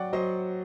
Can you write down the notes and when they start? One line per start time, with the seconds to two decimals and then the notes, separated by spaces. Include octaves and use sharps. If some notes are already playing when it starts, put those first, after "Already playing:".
Already playing: F#3 F#4 D5 F#5 G5
0.13 F#3 C5 D#5